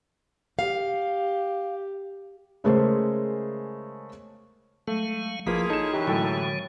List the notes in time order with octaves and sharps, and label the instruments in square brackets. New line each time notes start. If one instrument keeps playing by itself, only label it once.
[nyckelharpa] G4 [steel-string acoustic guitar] F5
[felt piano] C#3 G#3 A3 G#4 A#4 C5
[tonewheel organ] F#3 G#3 F5 [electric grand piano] A3
[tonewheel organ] G#1 B4 [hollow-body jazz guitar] F3 [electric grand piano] A#3 [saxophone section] E4 F4 G#4
[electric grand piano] D#4 E7 [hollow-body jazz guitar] A4 [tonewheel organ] C#5
[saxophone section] F#2 E3 [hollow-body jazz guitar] G4
[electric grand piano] A2 A4 G5 [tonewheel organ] D3 G#3 C#5 [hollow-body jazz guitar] F#3